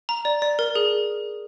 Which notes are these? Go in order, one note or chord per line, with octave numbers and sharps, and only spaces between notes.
A#5
D5
D5
A#4
G#4